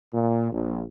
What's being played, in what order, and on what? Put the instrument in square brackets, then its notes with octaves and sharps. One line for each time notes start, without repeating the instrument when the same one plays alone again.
[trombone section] A#2
A#1